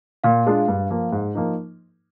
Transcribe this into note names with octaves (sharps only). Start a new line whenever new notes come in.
A#2 F5
G#3 D4 F4 G#4
G2
F3 A#3
G#2
F3 A#3 D#4